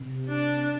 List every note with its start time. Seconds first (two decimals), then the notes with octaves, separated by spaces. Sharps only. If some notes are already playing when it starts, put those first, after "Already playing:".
Already playing: C3
0.29 D4